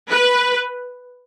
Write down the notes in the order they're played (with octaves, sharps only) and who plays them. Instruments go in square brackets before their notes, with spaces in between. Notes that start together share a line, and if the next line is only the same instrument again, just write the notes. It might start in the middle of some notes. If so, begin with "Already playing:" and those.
[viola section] B4